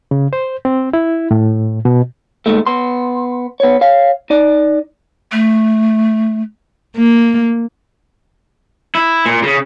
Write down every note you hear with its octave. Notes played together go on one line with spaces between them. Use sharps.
C#3
C5
C4
E4
A2
B2
A#2 D#3 G#3 A3
B3 C6
B3 C#5
C#5 F5
D#4 D5
A3
A#3
E4
A#2
C#3